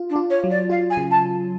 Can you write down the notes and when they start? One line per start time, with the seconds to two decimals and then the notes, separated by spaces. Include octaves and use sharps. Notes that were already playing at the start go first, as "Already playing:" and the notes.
Already playing: F4
0.09 D4
0.16 F4
0.30 C#5
0.44 F#3
0.50 D5
0.70 F4 F5
0.90 G#5
0.97 C#3
1.11 A5